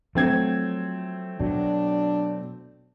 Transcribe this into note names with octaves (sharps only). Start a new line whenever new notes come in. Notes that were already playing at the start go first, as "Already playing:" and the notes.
F3 F#3 A3 C4 G#6
B2 F#3 D4